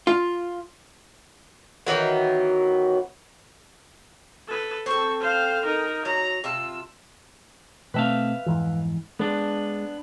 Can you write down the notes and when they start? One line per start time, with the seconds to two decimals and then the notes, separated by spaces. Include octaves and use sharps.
0.07 F4
1.87 D#3 E3 F#3 B3
4.48 A4 B4
4.86 C4 A4 C#6
5.20 C5 F5
5.64 D#4 A#4
6.05 F#3 A#5
6.44 C3 F4 A5 E6
7.94 B2 A3 C4 B4 E5 F5
8.46 F2 G#2 E3
9.19 G#3 B3 D4